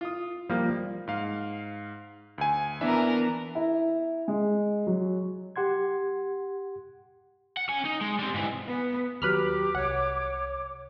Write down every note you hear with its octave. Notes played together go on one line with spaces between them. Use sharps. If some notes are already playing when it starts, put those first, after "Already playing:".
F4 D#6
F3 G3 A#3
G#2 F5
D2 G#5
E3 B3 D4 A#4 E5
E4
G#3
F#3
G4 F#5 C6 G#6
F#5
C#4 G#5
D#4
G#3
G3 C4
G#2 E3
B3
D#2 F#3 G4 B4 A#5 B5 D6 F6
C2 C#5 F#5